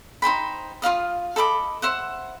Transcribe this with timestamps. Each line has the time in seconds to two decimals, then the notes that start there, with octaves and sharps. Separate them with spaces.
0.22 D#4 C5 G5 B5
0.82 F4 D#5 F5 D#6
1.36 A4 D#5 B5 D6
1.82 C5 E5 F#5